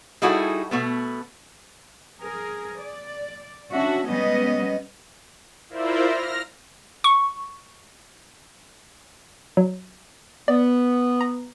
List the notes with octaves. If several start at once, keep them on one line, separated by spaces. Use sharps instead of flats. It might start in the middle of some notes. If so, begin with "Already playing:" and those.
G3 D#4 E4 F#4 G#4 A4
B2 A3 B3
G#4 A#4
D5
C#4 D4 F#4 E5
G3 G#3 B3 C#4 D#5
E4 F4 A#4 C5 D5 E5
F6 A#6
C#6
F#3
B3 D5
A#5